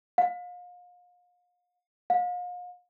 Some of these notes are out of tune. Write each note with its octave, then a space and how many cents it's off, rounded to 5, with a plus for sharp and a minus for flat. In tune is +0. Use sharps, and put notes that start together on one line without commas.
F5 +35
F5 +40